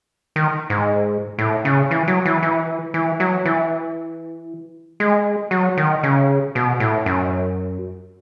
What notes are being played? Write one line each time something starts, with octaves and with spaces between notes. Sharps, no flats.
D#3
G#2
A2
C#3
E3
F#3
E3
E3
E3
F#3
E3
G#3
F#3
D#3
C#3
B2
A2
F#2